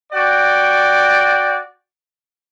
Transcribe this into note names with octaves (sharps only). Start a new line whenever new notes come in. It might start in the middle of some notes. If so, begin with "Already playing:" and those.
F#4 D5 G5